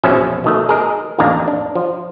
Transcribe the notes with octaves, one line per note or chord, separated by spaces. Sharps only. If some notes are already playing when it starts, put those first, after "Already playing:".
A#1 E2 B2 F3 C#4 E5
B2 D#3 A3
G#4 A#4 D#5
A1 F2 D#3 A#3 D4 A#5
D4
F3